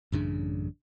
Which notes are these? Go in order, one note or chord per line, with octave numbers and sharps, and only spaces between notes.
A1 F#2 C#3 D4